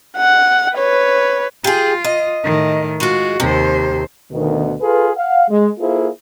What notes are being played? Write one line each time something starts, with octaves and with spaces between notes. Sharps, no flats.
F#5
B4 C#5
F4 G4 G#4
D#5
A2 D#3
G#3 F4 F#4
D#2 C3 C5
D2 B2 D#3
F4 G#4 A4 B4
F5 F#5
G#3
A#3 E4 F4 G#4 A4 C5